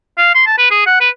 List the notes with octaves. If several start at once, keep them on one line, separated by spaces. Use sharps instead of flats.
F5
C6
A5
B4
G#4
F#5
B4